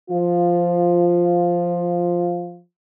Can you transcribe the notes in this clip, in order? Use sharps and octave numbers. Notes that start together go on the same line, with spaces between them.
F3 F4